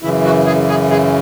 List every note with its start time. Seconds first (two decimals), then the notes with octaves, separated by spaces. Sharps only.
0.02 F#2 C#3 E3 E4
0.25 F#4
0.46 G#4
0.69 G#4
0.91 G#4